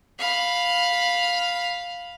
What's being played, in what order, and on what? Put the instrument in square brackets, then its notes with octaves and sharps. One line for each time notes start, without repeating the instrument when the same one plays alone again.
[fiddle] F5 B5